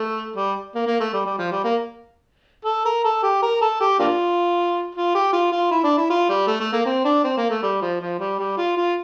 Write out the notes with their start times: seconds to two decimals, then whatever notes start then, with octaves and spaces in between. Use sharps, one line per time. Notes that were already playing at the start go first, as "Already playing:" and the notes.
Already playing: A3
0.36 G3
0.75 A#3
0.87 A#3
1.00 A3
1.13 G3
1.26 G3
1.39 F3
1.52 G3
1.64 A#3
2.65 A4
2.85 A#4
3.05 A4
3.23 G4
3.42 A#4
3.62 A4
3.81 G4
4.00 A#3 D4 F4
4.95 F4
5.15 G4
5.33 F4
5.52 F4
5.71 E4
5.84 D4
5.98 E4
6.10 F4
6.29 G3
6.47 A3
6.60 A3
6.73 A#3
6.86 C4
7.05 D4
7.24 C4
7.37 A#3
7.50 A3
7.63 G3
7.82 F3
8.01 F3
8.19 G3
8.39 G3
8.58 F4
8.77 F4